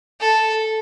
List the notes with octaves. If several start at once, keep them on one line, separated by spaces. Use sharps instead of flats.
A4